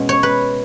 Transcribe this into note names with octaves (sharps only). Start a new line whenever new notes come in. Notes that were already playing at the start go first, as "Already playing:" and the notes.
Already playing: B2 G#3 C#4
C#5
B4